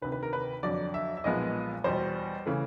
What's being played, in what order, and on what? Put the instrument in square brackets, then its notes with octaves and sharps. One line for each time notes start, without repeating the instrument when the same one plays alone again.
[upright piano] D2 C3 D#3 B4
B4
A#4
B4
F2 D3 F#3 D5
E5
E5
B1 A#2 F3 G#3 B3 D#5
E2 B2 G3 C5
C#3 E3 A3